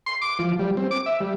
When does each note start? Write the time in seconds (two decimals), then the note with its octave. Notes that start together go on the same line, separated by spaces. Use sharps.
0.06 C6
0.21 D6
0.39 F3
0.59 G3
0.77 C4
0.91 D6
1.06 E5
1.20 G3